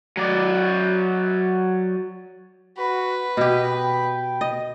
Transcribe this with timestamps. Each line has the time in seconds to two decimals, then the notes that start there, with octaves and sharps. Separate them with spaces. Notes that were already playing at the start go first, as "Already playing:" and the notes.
0.17 F#3 D5
2.77 F#4 B4
3.37 B2 G4 D#5
3.73 G5
4.41 D#5